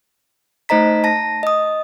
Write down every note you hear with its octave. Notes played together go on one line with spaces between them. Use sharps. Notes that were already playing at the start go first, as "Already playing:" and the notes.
A3 D#4 C5 D#5 A#5 B6
A5 A#6
D#5 D#6